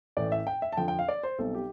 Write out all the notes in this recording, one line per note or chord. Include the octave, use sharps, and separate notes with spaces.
A1 A2 E3 D5
E5
G5
E5
A5
F2 D3 F3 C4 G5
G5
F5
D5
C5
B1 B2 G3 C4 A4
G4